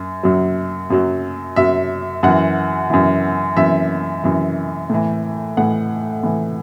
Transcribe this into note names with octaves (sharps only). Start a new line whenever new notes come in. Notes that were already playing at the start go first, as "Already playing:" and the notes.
Already playing: F#2
F#2 F#3
F#2 F#3
F#2 F#3 E5
F#2 E3 F#5
F#2 E3
F#2 E3 E5
F#2 E3
A2 E3
A2 E3 F#5
A2 E3